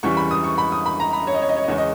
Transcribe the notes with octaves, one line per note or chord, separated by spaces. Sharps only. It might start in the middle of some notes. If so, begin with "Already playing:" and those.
E2 C#3 E3 G3 C#6
B5
D#6
C#6
B5
D#6
B5
A#5
B5
C#5
D#5
C#5
D#5
C#5
D#5
E2 C#3 G#3 C#5
D#5